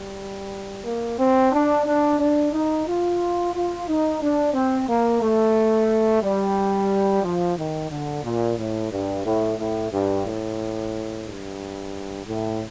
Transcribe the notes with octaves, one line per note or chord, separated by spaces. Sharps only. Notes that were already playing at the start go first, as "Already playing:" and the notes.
Already playing: G3
A#3
C4
D4
D4
D4
D#4
F4
F4
D#4
D4
C4
A#3
A3
G3
F3
D#3
D3
A#2
A2
G2
A2
A2
G2
A2
G2
A2